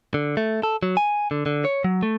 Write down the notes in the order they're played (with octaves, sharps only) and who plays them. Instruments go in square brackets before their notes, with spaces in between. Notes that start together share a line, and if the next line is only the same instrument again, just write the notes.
[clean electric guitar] D3
A3
A4
F#3
G#5
D3
D3
C#5
F#3
A3